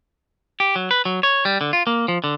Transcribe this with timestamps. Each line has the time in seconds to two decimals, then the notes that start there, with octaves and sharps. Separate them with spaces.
0.60 G4
0.76 F#3
0.91 B4
1.05 F#3
1.23 C#5
1.45 G3
1.61 D3
1.73 F4
1.87 A#3
2.08 F3
2.24 D3